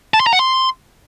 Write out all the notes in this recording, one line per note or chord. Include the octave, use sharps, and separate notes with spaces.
A5
C6
A#5
F#5
C6